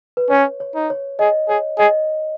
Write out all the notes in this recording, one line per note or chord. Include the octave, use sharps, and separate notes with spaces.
B4
C#4 C#5
C#5
D#4
C#5
G#4 D#5
G#4 C#5
G#4 D#5